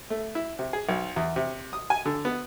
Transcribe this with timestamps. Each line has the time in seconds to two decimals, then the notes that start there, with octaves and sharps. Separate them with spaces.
0.10 A3
0.35 E4
0.59 C3
0.73 G#4
0.89 B1
1.16 E2
1.36 C3
1.73 D#6
1.90 G#5
2.05 D3
2.25 B3